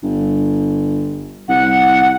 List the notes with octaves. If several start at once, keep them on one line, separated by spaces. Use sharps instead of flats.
G1
C2 F#5